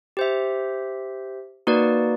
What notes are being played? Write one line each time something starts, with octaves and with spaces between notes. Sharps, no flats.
G4 C5 E5
A#3 D#4 F#4 B4 D5